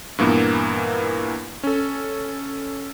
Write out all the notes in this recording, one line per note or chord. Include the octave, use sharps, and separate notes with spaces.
G2 A#2 E3 A#3 B3
C#4 A4